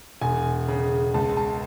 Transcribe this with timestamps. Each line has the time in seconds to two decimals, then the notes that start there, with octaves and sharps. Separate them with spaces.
0.21 E1 G#5
0.68 C#3
1.14 C#2 A5
1.37 A5